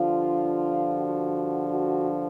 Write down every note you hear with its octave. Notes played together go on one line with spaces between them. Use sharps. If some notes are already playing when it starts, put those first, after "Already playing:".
Already playing: G2 D3 F3 F4
F#4
F#4